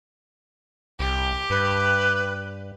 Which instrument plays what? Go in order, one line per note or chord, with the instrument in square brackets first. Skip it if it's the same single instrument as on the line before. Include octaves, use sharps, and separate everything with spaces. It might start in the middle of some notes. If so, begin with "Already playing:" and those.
[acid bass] C2 [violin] G4
[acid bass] G2 [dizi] B4